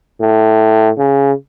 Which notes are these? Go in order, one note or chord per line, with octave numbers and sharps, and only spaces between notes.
A2
C#3